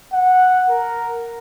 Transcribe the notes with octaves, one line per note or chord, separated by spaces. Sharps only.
F#5
A#4